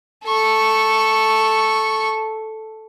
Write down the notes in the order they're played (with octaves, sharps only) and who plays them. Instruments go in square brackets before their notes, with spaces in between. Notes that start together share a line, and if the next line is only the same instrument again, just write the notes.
[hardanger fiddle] A4 C#6